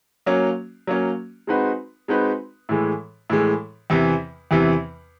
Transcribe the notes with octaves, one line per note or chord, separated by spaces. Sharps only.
F#3 A#3 C#4
F#3 A#3 C#4
G#3 C4 D#4 F#4 B4
G#3 C4 D#4 F#4 B4
A2 E3 G#3
A2 E3 G#3
E2 C3 E3
E2 C3 E3